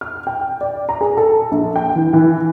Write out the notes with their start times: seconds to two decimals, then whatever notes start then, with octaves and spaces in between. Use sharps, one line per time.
0.01 F6
0.27 G5
0.61 D5
0.89 A#5
1.01 G#4
1.17 A4
1.51 A#1
1.76 G5
1.95 E3
2.13 E3